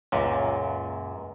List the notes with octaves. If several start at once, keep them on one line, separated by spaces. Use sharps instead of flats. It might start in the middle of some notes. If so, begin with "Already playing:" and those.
C#2 F#2 A#2